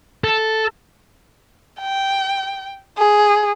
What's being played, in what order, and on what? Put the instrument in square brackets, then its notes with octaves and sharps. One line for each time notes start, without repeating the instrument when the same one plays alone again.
[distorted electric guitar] A4
[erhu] G5
G#4